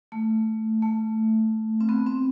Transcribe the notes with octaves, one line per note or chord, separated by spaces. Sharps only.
A3
A3
C4
B3
C4